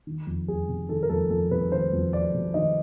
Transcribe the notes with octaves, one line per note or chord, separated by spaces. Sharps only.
D#3
F2
F2 G#4
C3
D#3 A4
A#4
F2 A4
F2 A4
C3 B4
D#3 C5
F2
F2 D5
C3
D#3 D#5